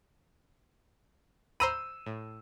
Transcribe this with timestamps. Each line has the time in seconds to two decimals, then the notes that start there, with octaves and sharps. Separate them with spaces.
1.60 C5 A#5 B5 E6 D#7
2.06 A2